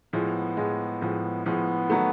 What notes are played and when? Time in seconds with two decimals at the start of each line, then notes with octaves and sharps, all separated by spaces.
0.13 A2 F3 G#3 B3
0.57 A2 F3 G#3
1.01 A2 F3 G#3
1.46 A2 F3 G#3 B3
1.90 D#3 F#3 A3